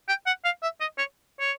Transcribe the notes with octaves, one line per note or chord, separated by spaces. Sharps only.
G5
F#5
F5
E5
D#5
C#5
C#5